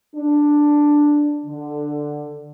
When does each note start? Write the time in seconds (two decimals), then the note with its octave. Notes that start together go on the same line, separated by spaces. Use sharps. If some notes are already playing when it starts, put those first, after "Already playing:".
0.16 D4
1.45 D3